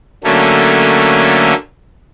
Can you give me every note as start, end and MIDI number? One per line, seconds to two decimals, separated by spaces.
0.24 1.54 50
0.24 1.54 54
0.24 1.54 57
0.24 1.54 58
0.24 1.54 61